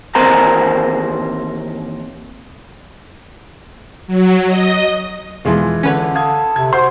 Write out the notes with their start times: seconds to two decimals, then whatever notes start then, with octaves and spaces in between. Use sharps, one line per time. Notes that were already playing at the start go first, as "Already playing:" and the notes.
0.15 D#2 E3 C4 A#4 C5 A#5
4.07 F#3
4.46 D#5
5.45 E2 B2 E3 F3 G#3 F4
5.83 D3 C#4 B4 C#5
6.15 A4 F5 D#6 G#6
6.56 C3 G#6
6.73 F#4 C5 C6